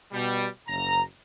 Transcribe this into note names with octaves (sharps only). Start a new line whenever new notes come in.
B2 G3
F#1 A#5